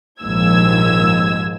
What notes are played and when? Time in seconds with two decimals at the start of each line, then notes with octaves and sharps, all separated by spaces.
0.23 A#1 D#2 G#2 F3 E6 G#6